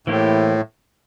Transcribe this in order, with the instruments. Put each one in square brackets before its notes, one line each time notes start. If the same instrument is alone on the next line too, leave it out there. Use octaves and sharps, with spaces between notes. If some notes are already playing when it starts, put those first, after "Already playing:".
[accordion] A2 [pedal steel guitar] E3 A#3 E4 G4 C5